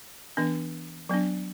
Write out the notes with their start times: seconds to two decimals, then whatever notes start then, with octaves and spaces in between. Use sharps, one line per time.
0.37 E3 B3 D4
1.09 F#3 B3 D4